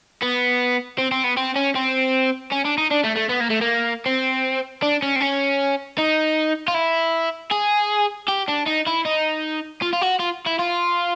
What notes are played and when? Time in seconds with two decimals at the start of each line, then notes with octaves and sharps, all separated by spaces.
0.22 B3
0.98 C4
1.11 C4
1.24 B3
1.37 C4
1.56 C#4
1.75 C4
2.52 C#4
2.65 D4
2.78 D#4
2.91 D4
3.04 A3
3.16 A3
3.29 B3
3.40 A#3
3.50 A3
3.61 A#3
4.06 C4
4.82 D4
5.02 C#4
5.16 C4
5.20 C#4
5.98 D#4
6.68 F4
6.74 E4
7.51 G#4
8.28 G4
8.48 D4
8.66 D#4
8.87 E4
9.05 D#4
9.82 F4
9.93 F4
10.02 F#4
10.20 F4
10.47 E4
10.59 F4